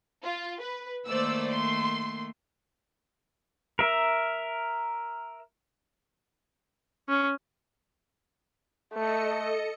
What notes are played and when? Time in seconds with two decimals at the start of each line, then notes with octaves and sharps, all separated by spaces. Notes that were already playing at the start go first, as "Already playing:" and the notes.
0.23 F4
0.61 B4
1.07 D#3 A3 A#3 C5 D5 E6
1.51 C6
3.79 A#4 E5
7.09 C#4
8.94 A3 A4 D#5 C#7